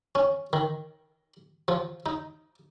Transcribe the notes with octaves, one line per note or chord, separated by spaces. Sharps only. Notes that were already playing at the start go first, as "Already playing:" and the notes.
C#4
D#3
F3
D#4